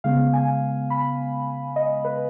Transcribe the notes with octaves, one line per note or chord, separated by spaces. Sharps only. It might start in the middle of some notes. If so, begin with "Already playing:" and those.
C#3 G#3 B3 F5
G#5
B5
D#5
B4